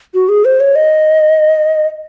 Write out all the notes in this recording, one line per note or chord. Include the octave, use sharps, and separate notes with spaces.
F#4
G#4
C5
C#5
D#5